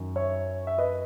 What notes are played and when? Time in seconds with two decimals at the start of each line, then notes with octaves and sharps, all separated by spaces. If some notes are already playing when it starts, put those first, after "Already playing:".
Already playing: F#2 D#3
0.16 C#5 E5
0.67 E5
0.78 B4 D#5